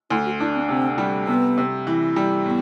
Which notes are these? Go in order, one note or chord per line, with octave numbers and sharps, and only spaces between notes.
D2 E4
F#4
D4 E4
C4
C3 C4
G3
C3 B3
C3
E3
G3
A2 B3